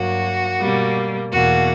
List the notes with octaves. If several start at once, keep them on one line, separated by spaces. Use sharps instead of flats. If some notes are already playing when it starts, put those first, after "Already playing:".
Already playing: G2 F#3 A#3 F#4
B2 G3 A#3
E2 B2 A#3 F#4